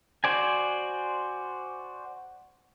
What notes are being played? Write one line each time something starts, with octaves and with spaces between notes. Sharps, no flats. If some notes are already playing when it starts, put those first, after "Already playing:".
F#4 C5 D5 G#5